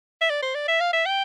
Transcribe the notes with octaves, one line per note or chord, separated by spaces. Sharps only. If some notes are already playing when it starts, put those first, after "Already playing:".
E5
D5
C5
D5
E5
F5
E5
G5